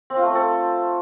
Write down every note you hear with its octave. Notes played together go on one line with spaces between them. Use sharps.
C4
F4
A3
C4
A4